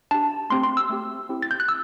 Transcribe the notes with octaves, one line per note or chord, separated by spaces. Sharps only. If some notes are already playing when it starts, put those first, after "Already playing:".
D4 G4 A5
A3 C4 G4 C6
C6
E6
A3 C4 G4
C4 E4 G4
A6
G6
F#6
E6